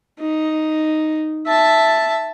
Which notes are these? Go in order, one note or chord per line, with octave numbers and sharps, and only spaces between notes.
D#4
E5 A5